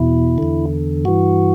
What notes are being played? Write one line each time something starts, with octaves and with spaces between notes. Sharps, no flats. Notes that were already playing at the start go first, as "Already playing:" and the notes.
Already playing: E2 B2 E4
E2 D3
G2 E3 F#4